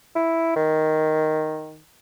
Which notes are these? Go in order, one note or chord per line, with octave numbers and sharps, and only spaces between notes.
E4
D#3